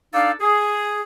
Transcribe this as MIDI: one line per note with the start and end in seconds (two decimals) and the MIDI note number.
0.13 0.31 62
0.13 0.31 63
0.13 0.31 69
0.13 0.31 74
0.13 0.31 77
0.40 1.02 68